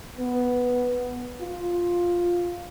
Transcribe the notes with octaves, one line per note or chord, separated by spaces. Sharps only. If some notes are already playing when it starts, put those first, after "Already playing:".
B3
F4